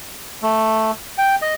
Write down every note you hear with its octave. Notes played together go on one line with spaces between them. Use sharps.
A3
G5
D#5